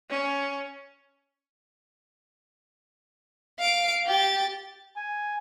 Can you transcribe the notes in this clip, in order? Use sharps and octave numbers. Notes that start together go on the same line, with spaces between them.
C#4
F5 D7
G4 A6
G#5